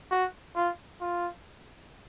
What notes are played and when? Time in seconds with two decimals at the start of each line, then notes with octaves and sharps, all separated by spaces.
0.11 F#4
0.55 F4
1.01 F4